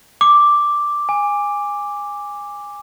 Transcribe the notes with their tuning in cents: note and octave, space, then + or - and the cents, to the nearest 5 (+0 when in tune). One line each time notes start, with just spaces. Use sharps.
D6 +0
G#5 -20